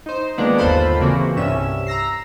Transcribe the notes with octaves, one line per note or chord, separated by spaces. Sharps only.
D#4 C5
D#3 F3 G#3 A#3 B3 D4
G1 D#2 F4 A4 C5 B5
A#2 C#3 E3 A#3 C4 F#4
C2 G2 C#4 E5 E7
A#5 E6 A#6 C7